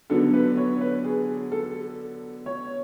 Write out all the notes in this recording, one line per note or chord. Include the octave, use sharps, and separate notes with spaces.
D3 F#3 B3 D4 A4
B4
C#5
B4
G#4
A4
C#5